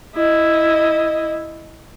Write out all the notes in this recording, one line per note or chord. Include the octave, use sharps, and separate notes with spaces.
E4 D#5